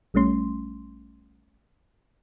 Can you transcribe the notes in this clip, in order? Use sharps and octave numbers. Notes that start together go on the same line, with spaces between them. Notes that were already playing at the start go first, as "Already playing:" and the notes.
A#1 G3 A3 C#4 C6